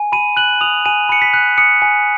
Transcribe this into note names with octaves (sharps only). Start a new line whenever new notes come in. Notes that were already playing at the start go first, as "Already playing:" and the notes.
Already playing: G#5
B5 D#7
F#6 F#7
D#6 F7
G#5 D#7
B5 C#7
B6
F#6
D#6 C#7
G#5